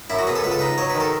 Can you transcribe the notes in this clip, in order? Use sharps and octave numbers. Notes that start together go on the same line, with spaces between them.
F#2 E4
F#4
B3 G#4
A4
C#2 B4
A4
D#4 B4
F#3 C#5
B4
D#3
A4